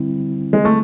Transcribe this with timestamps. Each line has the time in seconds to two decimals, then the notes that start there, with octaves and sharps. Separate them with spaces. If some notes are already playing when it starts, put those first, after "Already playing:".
Already playing: D3 G3 C4 E4
0.53 G#3
0.65 A3